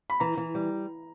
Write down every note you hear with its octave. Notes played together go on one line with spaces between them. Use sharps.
B5
E3 A#5
E3
G3